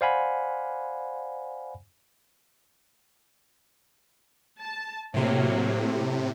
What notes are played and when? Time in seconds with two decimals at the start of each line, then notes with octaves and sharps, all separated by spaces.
0.01 C5 D5 F5 F#5 G#5 B5
4.61 A5
5.14 A2 C3 F#3 A#3